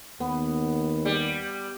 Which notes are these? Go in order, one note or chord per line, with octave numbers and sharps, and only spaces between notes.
D#2 B3
G3